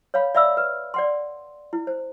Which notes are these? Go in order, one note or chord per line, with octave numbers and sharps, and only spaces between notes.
C#5 F5 B5
D5 E5 F5 B5 E6
B4
D5 F#5 C6
E4
C5